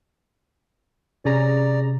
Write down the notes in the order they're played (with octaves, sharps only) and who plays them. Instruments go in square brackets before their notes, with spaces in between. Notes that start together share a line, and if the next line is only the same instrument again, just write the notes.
[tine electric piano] C3 [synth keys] C#4 G#4 A#5 [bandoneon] D5